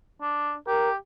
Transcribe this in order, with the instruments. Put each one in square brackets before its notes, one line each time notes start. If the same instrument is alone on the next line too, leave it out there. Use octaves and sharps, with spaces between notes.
[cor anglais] D4
[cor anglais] G4 [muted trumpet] A#4